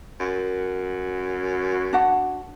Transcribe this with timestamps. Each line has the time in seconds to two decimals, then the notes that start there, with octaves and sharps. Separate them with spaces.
0.20 F#2
1.93 D4 F#4 F#5